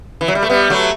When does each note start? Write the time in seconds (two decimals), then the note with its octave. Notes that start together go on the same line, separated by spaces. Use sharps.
0.21 E3
0.28 F#3
0.35 G3
0.42 A3
0.50 G3 B3
0.70 F#3 A3